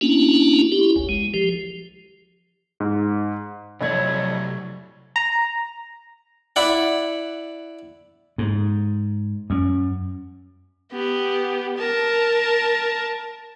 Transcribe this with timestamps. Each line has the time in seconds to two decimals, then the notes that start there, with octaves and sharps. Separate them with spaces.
0.01 A#3 B3 C#4 D4 E4 F#4
0.72 E4 G4
0.96 F#1 C#2
1.09 G#3
1.34 F3 G4
2.80 G#2
3.81 F2 C3 F#3 A3 C#5 D5 G#6
5.16 A#5
6.56 E4 D5 F#5
8.38 G#2
9.50 F#2
10.92 B3 G4
11.78 A#4 A5